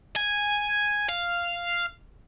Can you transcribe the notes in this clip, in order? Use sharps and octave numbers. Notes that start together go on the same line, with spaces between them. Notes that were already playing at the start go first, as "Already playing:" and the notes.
G#5
F5